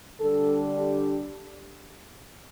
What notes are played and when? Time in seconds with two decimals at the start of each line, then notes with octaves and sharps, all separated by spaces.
0.20 D3 G3 D4 A4
0.76 G4